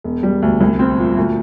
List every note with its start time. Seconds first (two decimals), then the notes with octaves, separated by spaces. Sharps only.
0.04 E1
0.23 G3
0.42 D2
0.61 C2
0.79 C4
0.98 A#2
1.17 D2